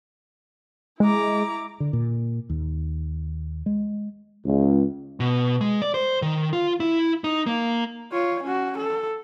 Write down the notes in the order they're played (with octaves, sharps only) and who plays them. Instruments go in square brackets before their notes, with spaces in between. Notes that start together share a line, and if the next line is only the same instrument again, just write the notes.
[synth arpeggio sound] G#3 [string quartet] E4 A#5 D6
[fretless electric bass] D3
A#2
D#2
G#3
[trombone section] C#2
[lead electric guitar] B2
G#3
D5
C5
D#3
F4
E4
D#4
A#3
[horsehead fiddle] F4 C#5
C#4 F#4
A4